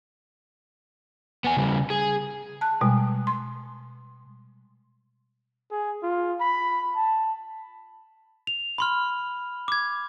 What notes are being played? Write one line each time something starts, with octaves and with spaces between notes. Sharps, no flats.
B3 G#5
C#3 G3
G#4
A5 F#6
B2 G3 G#3
C6
G#4
F4
B5
A5
F7
B5 C6 F6
D6 G#6